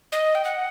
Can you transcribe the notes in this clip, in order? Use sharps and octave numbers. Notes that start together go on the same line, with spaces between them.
D#5
G5
F#5